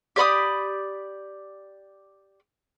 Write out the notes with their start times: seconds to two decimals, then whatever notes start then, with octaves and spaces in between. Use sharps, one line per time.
0.16 G4 D5 B5 D#6